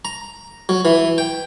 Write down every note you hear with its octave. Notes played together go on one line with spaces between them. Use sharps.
A#5
F#3
E3
G5